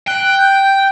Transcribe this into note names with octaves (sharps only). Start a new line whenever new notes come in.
G5 F#6
G6